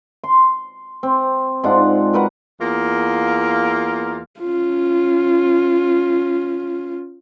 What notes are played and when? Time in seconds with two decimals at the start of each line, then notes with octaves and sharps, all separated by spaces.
0.24 C6
1.03 C4
1.64 G#2 D4 F4 F#5
2.13 F#4 A#4 B4 F#5
2.59 E2 A#3 F4
4.41 C#4 F4